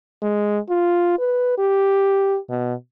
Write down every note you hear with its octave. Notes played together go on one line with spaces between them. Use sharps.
G#3
F4
B4
G4
B2